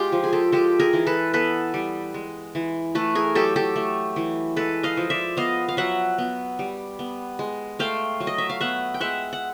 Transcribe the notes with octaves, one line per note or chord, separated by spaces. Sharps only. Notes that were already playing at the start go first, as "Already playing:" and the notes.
Already playing: G#3 F4 G4
F3
G#4
G4 A4
G#3 G4 A4
G#4 A#4
E3
A4 B4
B3 A4 B4
G3
G#3
E3
A3 A4 B4
G#4 A#4
F#3 G4 A4
G4 A4
A3
E3
G#3 A4 B4
D#5 F5
F3
D5 E5
B3 D#5 F5
F5
F#3 E5 F#5
B3
G3
B3
G#3
A3 F5 G5
F#3
D#5
E5
F5
B3 E5 F#5
G5
G#3 E5 F#5
F#5